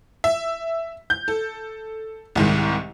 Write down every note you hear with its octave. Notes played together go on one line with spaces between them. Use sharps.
E5
G6
A4
C2 G#2 D#3